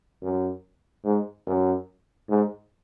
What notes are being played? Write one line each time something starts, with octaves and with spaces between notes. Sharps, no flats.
F#2
G#2
F#2
G#2